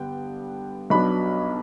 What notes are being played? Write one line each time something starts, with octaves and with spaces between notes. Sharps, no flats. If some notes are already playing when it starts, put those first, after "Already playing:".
Already playing: G2 D3 G3 B3 G5
B1 B2 F#3 B3 D4 B5